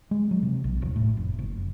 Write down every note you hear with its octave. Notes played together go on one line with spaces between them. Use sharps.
G#3
F#3
C3
A#1
D#1
A2
F1
F#1